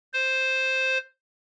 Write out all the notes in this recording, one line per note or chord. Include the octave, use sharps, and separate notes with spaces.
C5